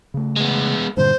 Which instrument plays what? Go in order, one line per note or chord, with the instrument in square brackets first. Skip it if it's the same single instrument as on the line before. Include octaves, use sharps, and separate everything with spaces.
[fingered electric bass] C#3 A3
[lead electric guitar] G#3 B3
[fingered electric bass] G2 A#2 D3 [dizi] C5